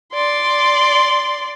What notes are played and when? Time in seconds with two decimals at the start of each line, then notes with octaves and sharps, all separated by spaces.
0.13 D5 C6